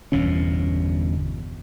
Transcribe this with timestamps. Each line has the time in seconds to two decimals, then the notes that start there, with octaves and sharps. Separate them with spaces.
0.12 G1 E2 B2 C#4